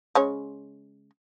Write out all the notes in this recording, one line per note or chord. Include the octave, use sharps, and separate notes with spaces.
C#3 G#3 C#5